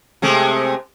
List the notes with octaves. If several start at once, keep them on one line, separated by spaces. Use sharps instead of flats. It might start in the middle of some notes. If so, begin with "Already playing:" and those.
C3 G#3 A3